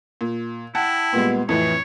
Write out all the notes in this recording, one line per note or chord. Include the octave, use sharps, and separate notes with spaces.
A#2
E4 F#5 G5 A5
A#2 G3 G#3 B3
F2 A2 E3 C#5